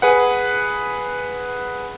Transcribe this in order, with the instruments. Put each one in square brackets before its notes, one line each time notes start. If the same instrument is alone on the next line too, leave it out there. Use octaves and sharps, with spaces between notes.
[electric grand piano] G#4 B4 F#5